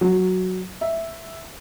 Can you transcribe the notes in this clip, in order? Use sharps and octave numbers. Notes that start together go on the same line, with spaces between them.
F#3
E5